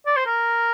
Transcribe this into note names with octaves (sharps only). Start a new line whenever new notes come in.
D5
C5
A#4